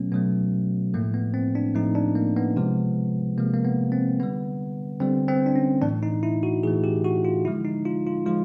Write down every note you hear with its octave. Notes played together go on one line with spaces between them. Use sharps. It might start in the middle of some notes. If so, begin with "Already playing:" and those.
Already playing: B2 F#3 A3 B3 C#4
B2 F#3 A3 B3
A2 F3 A3 A#3
B3
C4
D4
A2 F3 A3 D#4
D4
A#3
B3
C3 F3 G#3
C3 F3 G#3 A#3
A#3
B3
C4
D3 G3 B3
D3 G3 C4
C4
D4
C#4
A2 E3 A3 D4
D#4
E4
F#4
A2 E3 A3 G#4
G4
F#4
F4
D3 F3 G#3 E4
D#4
F4
F4
F3 G#3 F4